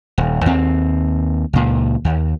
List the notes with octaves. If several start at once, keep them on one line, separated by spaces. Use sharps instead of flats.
D#1
D#2 C4
C#2 A#2
D#2